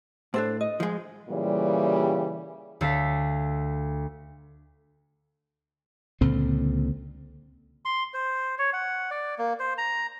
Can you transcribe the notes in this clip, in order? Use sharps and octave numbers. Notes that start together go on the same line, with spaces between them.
A2 D4 A4 C5
D#5
F3 G#3
A#2 C#3 E3 G3
D2 A4 F5 A5 B6
C#2 A#2 D3 C4
C6
C5
C#5
F#5
D5
A#3
C5
A#5